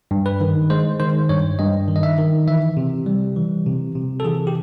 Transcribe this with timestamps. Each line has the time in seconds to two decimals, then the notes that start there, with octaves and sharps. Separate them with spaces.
0.11 G2
0.26 B4
0.41 D#3
0.70 G#3 C5
1.00 D#3 C5
1.29 G2 C#5
1.59 G2 D#5
1.88 D#3
1.96 D#5
2.03 E5
2.18 D#3
2.48 E3 E5
2.77 C3
3.06 G3
3.36 E3
3.66 C3
3.95 C3
4.20 A4
4.25 E3 G#4
4.47 G4